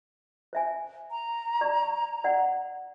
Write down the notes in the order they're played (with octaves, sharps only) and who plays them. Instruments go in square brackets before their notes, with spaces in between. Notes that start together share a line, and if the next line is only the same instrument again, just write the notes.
[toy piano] C5 E5 G#5
[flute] A#5
[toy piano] D5 C#6
D5 F#5